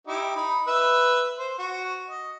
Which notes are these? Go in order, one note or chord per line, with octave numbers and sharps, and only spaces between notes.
D#4 E4 G4
D#4 B5
B4 E5
C5
F#4
D#5